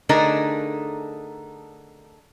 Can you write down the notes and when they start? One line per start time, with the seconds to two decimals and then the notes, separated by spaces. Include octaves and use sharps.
0.09 D3 A3 D4 D#4 G#4 A#4